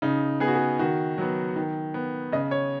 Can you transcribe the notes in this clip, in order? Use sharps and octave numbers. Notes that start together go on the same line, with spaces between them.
C#3 D#4
B3 G#4
F#4
G#4
D#3 F#4
F#3 B3
D#3
B3
C#3 D#5
C#5